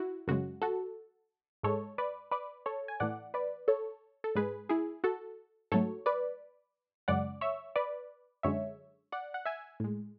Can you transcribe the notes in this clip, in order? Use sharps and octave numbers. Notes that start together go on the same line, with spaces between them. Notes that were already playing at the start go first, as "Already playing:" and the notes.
Already playing: E4 F#4
F#2 C#3 G#3 F#4
F#4 A4
G#2 G#3 A4 C#5
B4 D5
B4 D5
A4 C#5
G#5
A2 E3 A3 D5 F#5
B4 D5
A4 C#5
A4
G#2 G#3 G#4 B4
E4 G#4
F#4 A4
G#2 F#3 A3 A4 C#5
B4 D5
F#2 C#3 G#3 D5 F#5
C#5 E5
B4 D5
F#2 D3 G#3 C#5 E5
D5 F#5
F#5
E5 G#5
A2 G#3